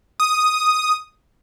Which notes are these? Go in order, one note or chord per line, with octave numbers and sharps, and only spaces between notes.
D#6